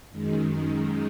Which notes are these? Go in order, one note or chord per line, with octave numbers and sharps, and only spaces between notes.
F#2 D#3 G#3